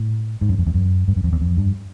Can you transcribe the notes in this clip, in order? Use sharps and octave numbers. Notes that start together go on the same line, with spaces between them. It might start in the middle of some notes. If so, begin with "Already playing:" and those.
Already playing: A2
G#2
F#2
F2
E2
F#2
G2
F#2
F2
E2
F2
G2